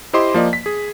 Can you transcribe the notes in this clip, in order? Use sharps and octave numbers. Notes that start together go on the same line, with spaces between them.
E4 G4 C5 D#5 C6 D6
F3 A#3 D5 D#5
B6
G#4